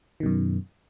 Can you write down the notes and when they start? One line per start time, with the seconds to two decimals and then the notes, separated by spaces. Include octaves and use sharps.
0.20 D#3
0.23 B2
0.26 F#2